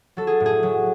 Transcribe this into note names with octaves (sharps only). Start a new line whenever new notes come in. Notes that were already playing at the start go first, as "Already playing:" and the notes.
F#3 A4
G#4
A2
G#4
F#3